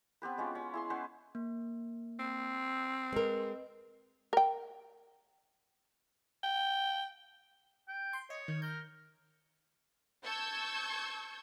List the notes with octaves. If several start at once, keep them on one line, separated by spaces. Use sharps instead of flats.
B3 C4 G4 B4
G#3 C#4 F4
C#4
E4 G#4 C6
B3 C#4 B4 C5
A#3
C4
G#3 A#4 B4 D#5
A#4 G5
G5
G5
C6
C#5 D#5
D#3
A#4 G6
A5 C#6 E6 G6 G#6